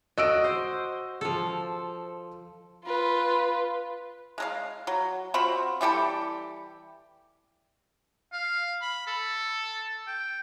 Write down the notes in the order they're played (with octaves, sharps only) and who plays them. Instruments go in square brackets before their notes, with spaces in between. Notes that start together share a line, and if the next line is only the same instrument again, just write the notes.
[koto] F#4 [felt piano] D#5 E6 D7
[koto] C5
F3 A4
[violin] F4 B4
[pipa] G#3 A#4 F5
F#3
C4 F4 F#4 B5
E3 G3 G4 A4
[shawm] F5
B5
A4
G5